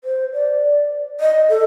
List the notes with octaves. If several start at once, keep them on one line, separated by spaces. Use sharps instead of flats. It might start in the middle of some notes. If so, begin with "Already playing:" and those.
C5
D5
D#5
A4